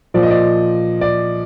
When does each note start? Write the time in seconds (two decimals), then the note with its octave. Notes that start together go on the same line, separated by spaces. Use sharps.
0.14 A#2 F3 D5
0.23 D#5
0.31 D5
1.01 D5